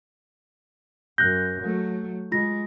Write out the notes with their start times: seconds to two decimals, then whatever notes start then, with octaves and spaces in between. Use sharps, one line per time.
1.18 F#2 F#6 G6 A#6
1.64 F#3 A3
2.32 G#3 F4 A#6